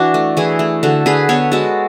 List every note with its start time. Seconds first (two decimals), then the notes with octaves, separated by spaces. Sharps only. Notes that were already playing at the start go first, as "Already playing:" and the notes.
Already playing: E3 D4 F#4
0.14 A3
0.37 E3 E4 G#4
0.59 A3
0.83 D3 F#4 A4
1.06 D3 G#4 B4
1.29 B3 A4 C#5
1.52 G#3 F#4 A4